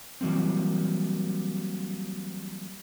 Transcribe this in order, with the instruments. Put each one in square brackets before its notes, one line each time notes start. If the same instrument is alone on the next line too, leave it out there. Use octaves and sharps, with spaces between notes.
[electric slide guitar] E3 F#3 G3 A#3 C4